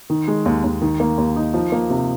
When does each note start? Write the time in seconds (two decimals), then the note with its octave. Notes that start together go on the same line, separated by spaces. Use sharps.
0.10 D#3
0.28 G#3
0.46 D#2
0.64 D#2
0.82 D#3
1.00 A#3
1.18 D#2
1.36 D#4
1.54 F3
1.72 A#3
1.90 C3